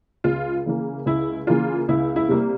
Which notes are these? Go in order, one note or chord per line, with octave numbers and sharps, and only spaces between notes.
C#2 F4
C#3 E3 A#3
C#2 E4
C#3 E3 A#3 F4
C#2 E4
E4
C3 G3 A#3